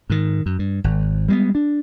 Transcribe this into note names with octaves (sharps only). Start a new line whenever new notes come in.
G#2 D#3
F#2
G2
G#1
G3 G#3 A#3 B3
D4